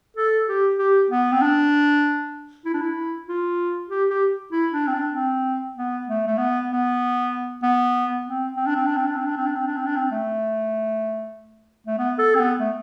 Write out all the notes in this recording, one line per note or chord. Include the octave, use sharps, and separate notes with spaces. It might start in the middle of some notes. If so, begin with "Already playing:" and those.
A4
G4
G4
B3
C4
D4
E4
D4
E4
F4
G4
G4
E4
D4
C4
D4
C4
B3
A3
A3
B3
B3
B3
C4
C4
D4
C4
D4
C4
D4
C4
D4
C4
D4
C4
D4
C4
D4
C4
A3
A3
B3
A4
C4
B3
A3